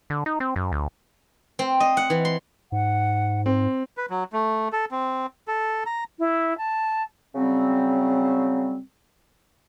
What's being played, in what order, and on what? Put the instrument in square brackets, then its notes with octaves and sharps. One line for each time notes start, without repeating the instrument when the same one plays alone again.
[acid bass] D3
D#4
C4
F#2
D2
[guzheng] C4
D#5
F#5
E3
C6
[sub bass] G#2 [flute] F#5
[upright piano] C4
[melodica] B4
F#3
A3
A4
C4
A4
A#5
[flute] E4
A5
[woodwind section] C#3 F#3 G3 C4